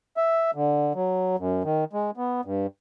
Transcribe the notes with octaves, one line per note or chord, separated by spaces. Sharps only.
E5
D3
F#3
F#2
D#3
G#3
B3
G2